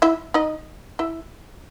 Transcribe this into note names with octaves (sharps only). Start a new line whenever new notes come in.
E4 E5
D#4 D#5
E4 E5